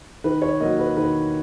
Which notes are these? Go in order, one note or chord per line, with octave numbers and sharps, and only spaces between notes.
D#3 B4
C#5
F#3 A#3 D#5
B4
D#3 B4